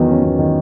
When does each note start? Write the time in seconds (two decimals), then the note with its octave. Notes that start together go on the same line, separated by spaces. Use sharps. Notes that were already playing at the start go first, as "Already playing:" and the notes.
Already playing: E2 D#3 F#3
0.09 C#4
0.24 E2
0.39 D#3